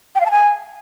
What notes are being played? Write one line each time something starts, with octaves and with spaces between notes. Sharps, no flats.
G5
F5
A5
G#5